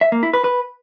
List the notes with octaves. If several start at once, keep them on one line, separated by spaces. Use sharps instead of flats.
E5
A#3
E4
B4
B4